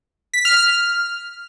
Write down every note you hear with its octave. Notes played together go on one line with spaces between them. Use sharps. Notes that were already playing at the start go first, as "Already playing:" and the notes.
B6
F6
F6